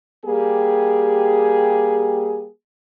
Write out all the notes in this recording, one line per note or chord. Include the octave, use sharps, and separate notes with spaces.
G3 A#3 G4 G#4